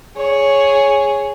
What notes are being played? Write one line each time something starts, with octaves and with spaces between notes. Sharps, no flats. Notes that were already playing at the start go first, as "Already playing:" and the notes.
G#4 C#5